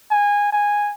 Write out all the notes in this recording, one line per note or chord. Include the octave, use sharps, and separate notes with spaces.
G#5
G#5